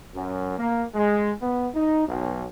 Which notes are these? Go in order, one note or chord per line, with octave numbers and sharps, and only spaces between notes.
F#2
A#3
G#3
B3
D#4
B1